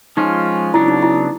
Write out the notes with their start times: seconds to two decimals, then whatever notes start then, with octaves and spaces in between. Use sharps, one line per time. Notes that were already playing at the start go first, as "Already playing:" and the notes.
0.17 F3 G#3 C#4 D#4 F4
0.74 C#3 F#3 B3 D4 E4
0.88 D#4
1.02 E4